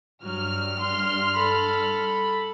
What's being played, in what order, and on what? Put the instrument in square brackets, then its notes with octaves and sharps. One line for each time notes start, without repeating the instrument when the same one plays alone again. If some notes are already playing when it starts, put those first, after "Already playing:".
[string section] G2 F6 [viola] F#3
[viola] C6
A4 B5